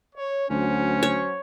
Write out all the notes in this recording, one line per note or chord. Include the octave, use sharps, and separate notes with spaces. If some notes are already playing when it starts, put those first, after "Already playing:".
C#5
D2 F#3 C#4 C5
C#5